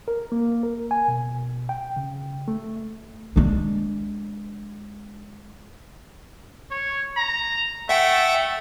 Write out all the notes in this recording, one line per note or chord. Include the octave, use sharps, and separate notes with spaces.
A#4
A#3
A#4
G#5
B2
G5
C#3
A3
G#3 D4
C#5
A#5
A3 E5 F#5 G5